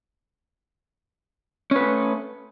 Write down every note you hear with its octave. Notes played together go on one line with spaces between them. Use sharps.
A3 C#4 B4